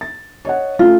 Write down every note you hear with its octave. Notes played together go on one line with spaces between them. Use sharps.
A6
C#5 D#5 F#5
A3 C#4 F4